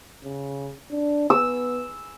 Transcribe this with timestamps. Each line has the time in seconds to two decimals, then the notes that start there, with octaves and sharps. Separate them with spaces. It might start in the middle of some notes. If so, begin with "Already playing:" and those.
0.24 C#3
0.90 D4
1.30 B3 E6